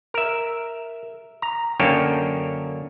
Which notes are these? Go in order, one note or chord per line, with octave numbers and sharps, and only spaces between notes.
A#4 E5
A#5
F#2 D3 A#3 C#5 G5 A5